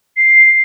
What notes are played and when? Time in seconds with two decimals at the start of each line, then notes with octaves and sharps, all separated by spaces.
0.16 C7